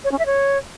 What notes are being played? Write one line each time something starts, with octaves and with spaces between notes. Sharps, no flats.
C#5
C#4
E5
C#5